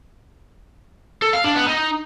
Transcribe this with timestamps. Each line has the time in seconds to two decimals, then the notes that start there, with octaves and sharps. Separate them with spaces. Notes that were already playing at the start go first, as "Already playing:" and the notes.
1.22 A4
1.33 F5
1.44 D4
1.56 B3
1.67 D#4